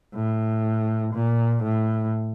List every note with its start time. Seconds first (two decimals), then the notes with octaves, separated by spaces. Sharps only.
0.15 A2
1.14 A#2
1.63 A2